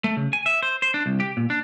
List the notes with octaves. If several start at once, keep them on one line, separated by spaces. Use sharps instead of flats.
A3
C#3
G#5
E5
C5
C5
D4
C2
G4
A#2
D4